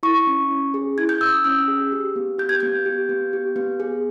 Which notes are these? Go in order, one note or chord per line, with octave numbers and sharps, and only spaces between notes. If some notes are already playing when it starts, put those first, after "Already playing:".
E4 C#6
C#4
C#4
G#4
E4 G#6
G6
C#4 E6
D#6
C#4 E6
G#4
G4
B3
G4 G6
G#6
B3 G6
G4
B3
G4
B3
G#4